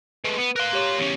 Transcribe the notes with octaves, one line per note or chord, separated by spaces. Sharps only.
G#3 A3 B4
B3
A#4 F5 C6 F#6
G4 C#5 D6
E2 C#4